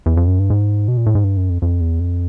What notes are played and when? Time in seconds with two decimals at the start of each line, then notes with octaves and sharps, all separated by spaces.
0.06 E2
0.17 F2
0.28 F#2
0.39 G2
0.50 G#2
0.88 B2
0.97 A#2
1.06 A2
1.15 G#2
1.24 G2
1.37 F#2
1.50 F2
1.62 F2
1.80 E2
1.99 F2